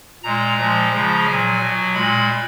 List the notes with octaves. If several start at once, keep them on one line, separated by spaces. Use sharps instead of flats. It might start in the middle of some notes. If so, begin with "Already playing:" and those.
A#2 G#3 A#5
A#2 F3 G#3 A#5
C#3 F3 G#3
A#2 F#3 G#5
B2 F#3
A#2 G#3 B5